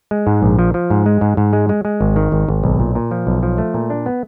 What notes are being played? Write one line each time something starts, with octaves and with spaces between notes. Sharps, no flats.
G#3
G#2
A#1
F3
F3
G#2
G#3
G#2
G#2
G#3
G#3
G#3
G#1
D#3
G#1
G#1
B1
A#2
A#2
F3
B1
F3
A3
A#2
D4
B3